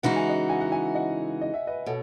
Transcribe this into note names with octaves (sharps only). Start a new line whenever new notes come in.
C#3 E3 G#3 D#4 F#4 F#5
G#5
D#5 F#5
G#5
F#5
E5 G#5
D#5 F#5
D#5
E5
B4 D#5
B2 A4 C#5